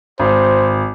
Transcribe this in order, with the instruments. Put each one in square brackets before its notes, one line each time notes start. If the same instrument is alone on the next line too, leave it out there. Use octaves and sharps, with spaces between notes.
[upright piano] G#1 [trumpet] C5